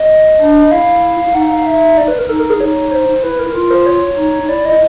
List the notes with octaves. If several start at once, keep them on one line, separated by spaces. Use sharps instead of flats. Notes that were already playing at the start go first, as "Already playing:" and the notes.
Already playing: D#5
D4
E4 F5
D#4 F#5
F5
E5
D5
B4
A#4
D#4 A4
A#4
G#4
D#4 C#5
C5
E4 B4
A#4
F4 A#4
C5
C#5
D#4
E4 D5
D#5